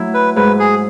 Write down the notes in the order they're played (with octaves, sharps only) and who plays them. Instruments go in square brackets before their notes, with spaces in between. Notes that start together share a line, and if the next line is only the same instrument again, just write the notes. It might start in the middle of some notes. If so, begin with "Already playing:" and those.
Already playing: [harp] F#3 A3 E4
[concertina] B4
[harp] G#2 [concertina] B4
[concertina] G#4